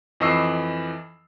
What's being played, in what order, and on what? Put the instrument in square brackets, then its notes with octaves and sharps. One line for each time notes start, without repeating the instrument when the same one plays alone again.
[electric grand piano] F2 E3 D#5 C#6 E6 C7